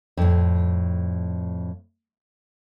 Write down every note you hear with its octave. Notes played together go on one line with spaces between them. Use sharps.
F2 A2